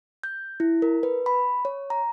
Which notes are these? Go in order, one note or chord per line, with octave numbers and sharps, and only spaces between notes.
G6
E4
A#4
B4
B5
C#5
A#5